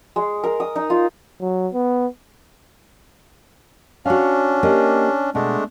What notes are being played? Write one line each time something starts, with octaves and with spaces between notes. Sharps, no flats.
G#3
A#4
D#6
D#4
F4
F#3
B3
C#4 D4 F#4 F5
A#3 G4 D#5
B2 G#3 A3 D4